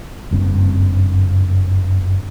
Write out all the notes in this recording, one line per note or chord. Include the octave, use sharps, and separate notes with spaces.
F#1 G2 C4